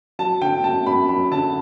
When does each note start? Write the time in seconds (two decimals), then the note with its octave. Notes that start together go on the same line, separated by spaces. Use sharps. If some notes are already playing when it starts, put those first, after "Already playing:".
0.19 F#3 A5
0.42 D3 G5
0.64 F#2 A5
0.86 F#2 B5
1.09 F#3 B5
1.31 D3 A5